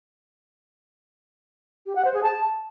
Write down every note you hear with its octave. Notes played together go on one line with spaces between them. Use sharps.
G4
F#5
C5
G#4
A5